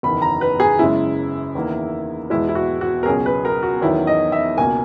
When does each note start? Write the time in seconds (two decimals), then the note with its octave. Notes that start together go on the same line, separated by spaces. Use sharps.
0.03 F#1 E2 D#3 B5
0.22 A#5
0.41 B4
0.60 G#4
0.79 F#1 F#2 C#3 G#3 E4
1.55 E2 D#3 A#3
2.30 E2 B2 G#3 E4
2.49 E4
2.55 F#4
2.81 F#4
3.03 A#4
3.06 C#2 B2 F#3 C#4 G#4
3.26 B4
3.45 A#4
3.63 F#4
3.81 E2 D#3 F#3 C#4 E4
4.07 D#5
4.32 E5
4.57 C#2 B2 A#3 G#5